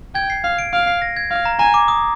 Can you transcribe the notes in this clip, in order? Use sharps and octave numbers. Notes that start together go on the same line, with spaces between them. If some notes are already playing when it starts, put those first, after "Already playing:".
G5 G#6
C7
F5 C7
D7
F5 D7
C7
A#6
G#6
F5
A#5
G#5 A#5
D6
D#6